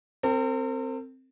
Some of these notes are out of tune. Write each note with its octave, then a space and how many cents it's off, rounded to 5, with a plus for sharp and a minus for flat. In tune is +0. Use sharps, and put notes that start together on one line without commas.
C4 +0 A#4 -45